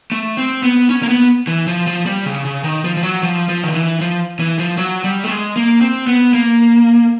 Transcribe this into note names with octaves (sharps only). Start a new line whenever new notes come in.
A3
C4
B3
C#4
A#3
B3
E3
F3
F3
G3
C#3
C#3
D#3
F3
F3
F#3
F3
F3
D#3
E3
F3
E3
F3
F#3
G3
A3
G#3
A#3
C4
B3
A#3